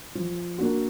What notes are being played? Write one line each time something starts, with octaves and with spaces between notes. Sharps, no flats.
F3
A#3 D4 F#4